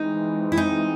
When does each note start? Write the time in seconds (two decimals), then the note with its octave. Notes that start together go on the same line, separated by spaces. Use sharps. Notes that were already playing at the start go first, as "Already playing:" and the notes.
Already playing: E3 G#3 C4 D#4
0.52 E4
0.57 D#4